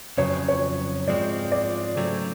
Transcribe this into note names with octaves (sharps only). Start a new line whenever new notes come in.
F2 C#3 F#3 C#5
C#5
G#2 F3 G#3 C4 D5
D5
C#3 F#3 A3 C4